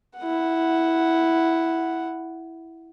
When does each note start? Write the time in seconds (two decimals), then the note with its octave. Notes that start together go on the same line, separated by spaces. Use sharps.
0.19 E4 F#5